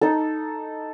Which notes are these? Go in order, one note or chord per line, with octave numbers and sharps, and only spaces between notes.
D#4 A4